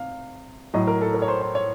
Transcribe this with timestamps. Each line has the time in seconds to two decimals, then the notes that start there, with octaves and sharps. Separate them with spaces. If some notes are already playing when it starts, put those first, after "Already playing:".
Already playing: C3 F5
0.74 A2 F#3 D#5
0.87 A#4
1.01 A4
1.14 A#4
1.22 C#5
1.28 C5
1.41 C5
1.55 C#5